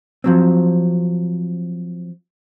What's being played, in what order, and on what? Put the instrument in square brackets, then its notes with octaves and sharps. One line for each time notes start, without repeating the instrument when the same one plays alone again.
[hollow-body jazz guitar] F3 F#3 C4